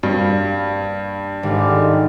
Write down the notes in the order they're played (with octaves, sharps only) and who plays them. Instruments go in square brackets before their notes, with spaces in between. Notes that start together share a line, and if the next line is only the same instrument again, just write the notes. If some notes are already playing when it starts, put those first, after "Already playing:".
[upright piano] G2 [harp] A#3
[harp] G#1 F6 [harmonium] D3 G#3 G4